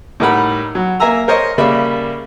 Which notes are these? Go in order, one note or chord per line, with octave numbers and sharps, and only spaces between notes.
A2 G3 D#4 A#4 F#5 B5
F#3
A#3 E5 G#5 A#5 E6
A#4 C5 C#5 D#5
C#3 G3 A#3 D5 E5 B5